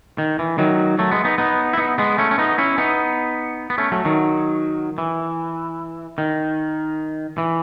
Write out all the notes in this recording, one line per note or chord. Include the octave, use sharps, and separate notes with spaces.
D#3
E3
D#3 F#3
F#3 A3
G#3 B3
B3 D#4
B3 D#4
E4
B3 D#4
G#3 B3
A3 C#4
C#4
B3 D#4
C#4 E4
B3 D#4
B3
A3 C#4
F#3 A3
D#3 F#3
E3
D#3
E3